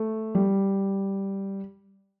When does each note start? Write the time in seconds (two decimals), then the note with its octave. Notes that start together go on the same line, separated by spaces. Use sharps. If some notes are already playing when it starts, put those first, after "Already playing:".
Already playing: A3
0.35 G3